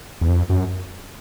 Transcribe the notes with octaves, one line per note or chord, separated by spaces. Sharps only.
E2
F2
F#2